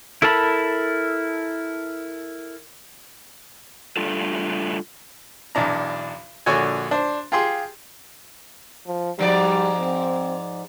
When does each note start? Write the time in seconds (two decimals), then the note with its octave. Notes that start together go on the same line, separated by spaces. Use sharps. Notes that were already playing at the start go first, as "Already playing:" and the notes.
0.22 E4 A4 A#4 A5 B5
3.97 G3 A3 D4 F4 A4
5.55 B1 E2 D4 A#5
6.46 A#1 D3 F#4 C#5 G#5
6.91 D4 C5
7.32 F4 G4 G#4 C6
8.87 F3
9.19 G#2 F3 G3 D5
9.81 C4